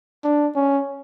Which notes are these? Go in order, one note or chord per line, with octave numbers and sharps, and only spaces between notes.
D4
C#4